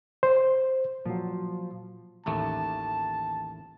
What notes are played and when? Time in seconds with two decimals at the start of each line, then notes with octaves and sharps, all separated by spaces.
0.23 C5
1.06 A#2 F3 F#3
2.26 A1 D#2 A3 A5